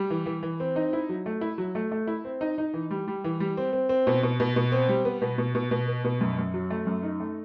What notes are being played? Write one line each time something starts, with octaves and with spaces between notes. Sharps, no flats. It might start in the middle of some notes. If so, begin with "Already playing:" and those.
Already playing: G3
E3
E3
E3
C4
D#4
E4
F#3
A3
E4
F#3
A3
A3
E4
C4
D#4
D#4
E3
G3
G3
E3
G3
C4
C4
C4
B2
B2
B2
B2
C4
G3
B3
B2
B2
B2
B2
B3
B2
F#2
F#2
F#3
A3
F#2
D#4
A3